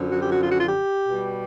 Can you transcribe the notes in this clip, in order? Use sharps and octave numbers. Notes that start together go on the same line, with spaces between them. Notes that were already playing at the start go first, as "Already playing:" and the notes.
Already playing: F#2 D3 F3
F#4
G4
F#4
F4
F#4
F4
G4
B2 G3